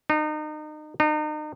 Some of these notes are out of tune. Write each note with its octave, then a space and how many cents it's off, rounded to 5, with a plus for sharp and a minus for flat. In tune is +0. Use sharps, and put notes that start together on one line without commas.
D#4 -30
D#4 -35